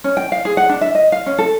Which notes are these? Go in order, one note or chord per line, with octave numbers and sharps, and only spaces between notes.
C#4
G5
F5
G#4
F#5
D4
E5
D#5
F5
C#4
A4